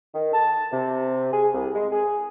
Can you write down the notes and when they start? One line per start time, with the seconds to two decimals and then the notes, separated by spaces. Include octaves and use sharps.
0.14 D#3
0.33 A5
0.72 C3
1.32 G#4
1.54 C2
1.75 G#3
1.92 G#4